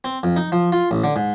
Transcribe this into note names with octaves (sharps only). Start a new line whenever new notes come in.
C4
F2
D#4
F3
F4
A1
D3
G#2